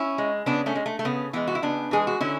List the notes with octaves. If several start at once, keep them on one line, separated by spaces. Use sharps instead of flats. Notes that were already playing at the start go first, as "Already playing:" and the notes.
Already playing: C#4 E4
G#3
C#3 B3 D4
A3 C#4
G#3
A3
A3
C#3 B3
E3 G#3 B3
F#4
E4
C#3 B3 D4
E3 G#3 G#4
F#4
D3 C#4 E4